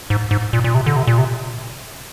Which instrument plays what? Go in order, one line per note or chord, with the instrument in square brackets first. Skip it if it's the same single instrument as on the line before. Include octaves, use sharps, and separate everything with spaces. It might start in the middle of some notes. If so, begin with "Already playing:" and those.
[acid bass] G#2
G#2
A#2
A#2
C3
D3
C3
A#2
C3